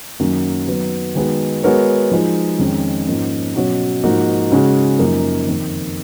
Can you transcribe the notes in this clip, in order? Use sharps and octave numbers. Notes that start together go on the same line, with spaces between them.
F#2 D#3 F#3 A#3 C#4
D#3 F#3 B3
D#3 G#3 B3 F#4
G#3 B3 F#4 A#4 C#5
F3 G#3 D#4
F2 D#3 G#3 C#4
G#2 F3 A#3 C#4
B2 F#3 C#4 F#4 C#5
G#2 F3 A#3 D#4 F#4
C#3 G#3 C#4 F#4
F#2 F3 A#3 D#4 A#4
F2 D#3 A#3